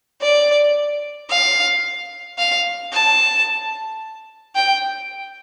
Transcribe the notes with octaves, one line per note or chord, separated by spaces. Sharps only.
D5
F5
F5
A5
G5